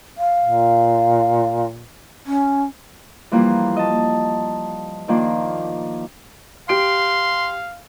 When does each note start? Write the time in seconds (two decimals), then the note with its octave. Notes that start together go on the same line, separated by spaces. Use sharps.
0.18 F5
0.43 A#2
2.26 C#4
3.32 E3 F3 G3 A#3
3.76 D#5 A5
5.08 D#3 F3 A#3 D4
6.69 G4 F5 C6 D7